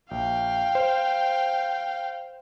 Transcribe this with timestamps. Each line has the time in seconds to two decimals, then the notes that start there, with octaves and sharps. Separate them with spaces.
0.11 A#1 F5 G5
0.75 C5